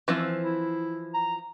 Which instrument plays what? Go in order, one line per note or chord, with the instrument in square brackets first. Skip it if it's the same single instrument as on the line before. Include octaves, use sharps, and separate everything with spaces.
[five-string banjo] E3 F3 C4
[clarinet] E4
A#5